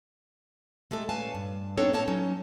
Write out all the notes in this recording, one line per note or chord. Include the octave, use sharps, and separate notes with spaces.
G#3 A3 G4 A4
A#2 C#4 B4 F5 G#5 A5
G2
B3 C4 D4 D#4 A4 C#5
A2 A#3 C4 C#5 A5
F#3 C#4 D#4